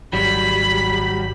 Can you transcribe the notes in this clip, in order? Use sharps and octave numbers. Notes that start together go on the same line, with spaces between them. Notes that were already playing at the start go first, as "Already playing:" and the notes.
G#1 F#3 G3 B5